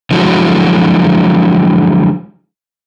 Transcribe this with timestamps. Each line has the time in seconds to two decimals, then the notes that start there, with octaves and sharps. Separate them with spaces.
0.11 D3 F3 F#3 G#3 E4 F#4